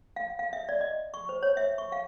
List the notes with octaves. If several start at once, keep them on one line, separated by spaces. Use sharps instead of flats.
F5
F5
E5
D5
D#5
C#6
C5
C#5
E5
C#6
F5